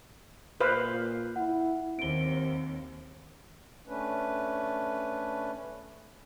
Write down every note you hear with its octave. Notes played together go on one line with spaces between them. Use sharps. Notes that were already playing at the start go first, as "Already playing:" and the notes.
A#2 B4 C5 F5
E4 F#5
D#2 C4 D7 G7
A3 C#4 D4 B4